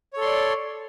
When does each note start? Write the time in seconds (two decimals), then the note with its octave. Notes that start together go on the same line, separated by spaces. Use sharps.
0.13 C#5
0.17 A4
0.21 C6
0.25 D5